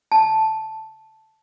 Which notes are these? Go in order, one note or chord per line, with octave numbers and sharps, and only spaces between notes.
A5